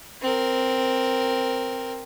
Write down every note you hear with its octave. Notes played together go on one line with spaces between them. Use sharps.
C4 A#4